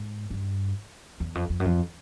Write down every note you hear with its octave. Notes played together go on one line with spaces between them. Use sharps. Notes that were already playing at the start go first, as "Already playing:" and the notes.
Already playing: G#2
G2
E2
F2
F2
F#2
F2